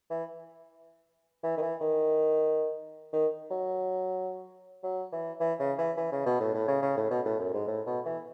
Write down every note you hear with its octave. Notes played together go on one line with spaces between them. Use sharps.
E3
E3
D#3
E3
D#3
D#3
F#3
F#3
E3
E3
C#3
E3
E3
C#3
B2
A2
A2
C#3
C#3
A2
B2
A2
F#2
G#2
A2
B2
E3